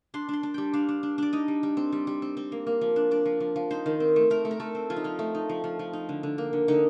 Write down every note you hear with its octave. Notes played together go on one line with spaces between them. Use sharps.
D4 C6
D4 C6
D4
G3 G5
D4 F5
D4
D4
D4 D5
D#4 D#5
G3
G3
C4
G3
G3
C4
C4
A#3
A#3
F3
D4
D4 D5
F3
F3
F3
D#4 C5
D#3
C4
A3
A3 A#4
A3
A#4
A3 A4
C4
F3 F4
D#4
F3 F4
A3
D#4
F3
F3
F3
D#4
D3
D3
A#3
D3
D3 D#4